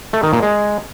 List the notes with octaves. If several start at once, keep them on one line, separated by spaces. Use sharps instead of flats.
A3
D#3
A#2
G#3